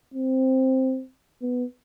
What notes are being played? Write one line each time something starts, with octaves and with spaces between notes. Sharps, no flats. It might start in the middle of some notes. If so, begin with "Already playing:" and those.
C4
B3